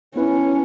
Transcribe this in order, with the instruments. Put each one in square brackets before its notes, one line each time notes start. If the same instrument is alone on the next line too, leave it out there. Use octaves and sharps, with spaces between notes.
[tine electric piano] B3 E4 B4 [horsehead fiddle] C#4